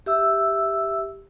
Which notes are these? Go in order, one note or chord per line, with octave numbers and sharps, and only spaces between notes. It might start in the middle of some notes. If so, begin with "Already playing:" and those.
G4 E5 E6